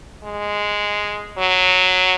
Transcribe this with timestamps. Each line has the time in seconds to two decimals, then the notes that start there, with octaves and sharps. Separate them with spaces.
0.24 G#3
1.38 F#3